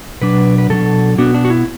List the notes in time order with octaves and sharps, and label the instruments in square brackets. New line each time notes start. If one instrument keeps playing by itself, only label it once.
[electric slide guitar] B2 F#3 D4 B4
B4
B2 F#3 D4 A4
B2 B3 D4 F#4
D4
F#4
E4